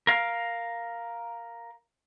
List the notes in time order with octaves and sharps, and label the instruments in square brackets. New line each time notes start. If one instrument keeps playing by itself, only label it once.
[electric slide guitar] A#4 F5